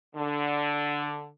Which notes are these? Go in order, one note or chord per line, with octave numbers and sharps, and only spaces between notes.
D3